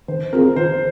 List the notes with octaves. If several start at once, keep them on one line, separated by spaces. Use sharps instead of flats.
D#3 C5
C4 F4 G#4 A#4
D#3 C5